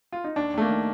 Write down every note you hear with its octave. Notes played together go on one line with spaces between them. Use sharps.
F4
D#4
D#2 D4
D#2 A3
A#3
D#3